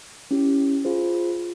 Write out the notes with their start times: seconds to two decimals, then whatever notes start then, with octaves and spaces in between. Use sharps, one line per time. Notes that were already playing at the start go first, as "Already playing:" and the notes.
0.31 C#4 E4 G4
0.85 F4 G#4 C5
1.39 F4